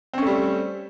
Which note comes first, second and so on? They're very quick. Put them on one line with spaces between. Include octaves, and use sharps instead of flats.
C4 C#4 A3 G3